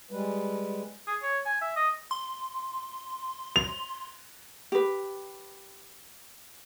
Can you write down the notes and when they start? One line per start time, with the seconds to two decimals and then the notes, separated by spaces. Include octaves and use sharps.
0.11 G3 G#3 B4
1.07 G#4
1.22 C#5
1.45 G#5
1.61 E5
1.76 D#5
2.11 C6
3.56 F7
4.72 G4 B4